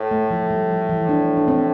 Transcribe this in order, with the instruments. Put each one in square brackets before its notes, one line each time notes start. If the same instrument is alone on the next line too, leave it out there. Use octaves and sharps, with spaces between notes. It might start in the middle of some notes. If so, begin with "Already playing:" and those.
Already playing: [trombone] A2
[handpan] A3
F3
G3
F3
E3
D4
D4
C4